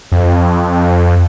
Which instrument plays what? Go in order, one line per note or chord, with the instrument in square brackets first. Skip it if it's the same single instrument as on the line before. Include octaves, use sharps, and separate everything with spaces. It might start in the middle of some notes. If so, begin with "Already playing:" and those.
[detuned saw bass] F2